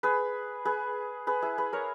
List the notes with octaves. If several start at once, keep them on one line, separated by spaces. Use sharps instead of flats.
G#4 B4
G#4 B4
G#4 B4
E4 G#4
G#4 B4
A#4 C#5